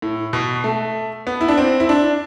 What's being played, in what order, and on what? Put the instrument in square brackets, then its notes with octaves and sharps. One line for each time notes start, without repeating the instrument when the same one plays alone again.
[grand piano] A2
B2
A3
B3
E4
D4
C4
E4
D4